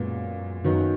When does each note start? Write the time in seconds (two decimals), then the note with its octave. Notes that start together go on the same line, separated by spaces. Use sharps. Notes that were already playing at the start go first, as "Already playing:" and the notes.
Already playing: F#2 A#2 G#3 B3
0.64 F#2 D#3 F#3 B3 D#4